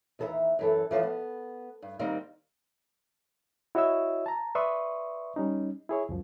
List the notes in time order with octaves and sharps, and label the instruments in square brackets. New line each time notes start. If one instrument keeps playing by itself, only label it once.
[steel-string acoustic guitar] D#2 E3 A4 B4 E5 A#5
F#2 E3 A4
E3 F3 C5 D5 D#5
B3
G2
D#3 G3 A#3 C4
[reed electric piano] E4 F#4 C#5 D#5 E5 E6
A5 A#5
B4 D5 E5 C6 C#6 D#6
G3 C#4 D#4
E4 G#4 C#5
C#2 F#2 F3